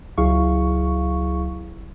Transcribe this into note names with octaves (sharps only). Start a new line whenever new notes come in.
C#2 F#3 E4 G#4 F5 C#6